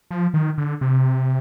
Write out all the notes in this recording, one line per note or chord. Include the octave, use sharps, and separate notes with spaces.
F3
D#3
D3
C3